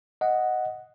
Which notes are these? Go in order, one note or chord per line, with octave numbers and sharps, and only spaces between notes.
D#5 F#5